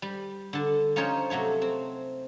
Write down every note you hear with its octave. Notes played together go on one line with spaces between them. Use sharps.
G3
D3 A5
F3 C#4 D#4 C5 C#5 G5
C3 F#3 A3 C#5
C4